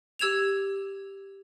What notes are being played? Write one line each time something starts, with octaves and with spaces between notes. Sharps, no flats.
G4 E6 G#6 E7 F7